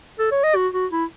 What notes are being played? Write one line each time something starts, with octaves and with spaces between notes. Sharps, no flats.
A4
C#5
D#5
F#4
F#4
E4